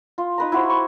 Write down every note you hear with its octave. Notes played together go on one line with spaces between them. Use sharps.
F4
D#4 B4 A#5
E4 F#4 C5
C#6